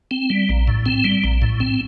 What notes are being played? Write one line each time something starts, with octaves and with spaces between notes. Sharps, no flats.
C4
G3
A#1
A2
C4
G3
A#1
A2
C4